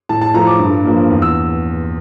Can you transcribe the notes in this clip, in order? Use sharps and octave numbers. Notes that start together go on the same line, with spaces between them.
A2 A5
A5
F3 A3 A#5
D6
G2
F3 A#3
E2
E6